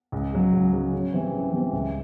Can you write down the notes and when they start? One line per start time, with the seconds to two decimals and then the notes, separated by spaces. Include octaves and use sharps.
0.12 C#2
0.33 C#3 F#3
0.53 C#2
0.72 C#3 F#3
0.93 C#3
1.13 E3 G3 C4
1.32 C#3
1.52 E3 G3 C4
1.73 C#2